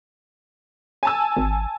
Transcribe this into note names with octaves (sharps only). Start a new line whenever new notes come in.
G#5 A5 E6
G#1